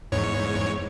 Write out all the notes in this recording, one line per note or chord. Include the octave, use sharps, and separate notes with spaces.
E2 G#2 C#5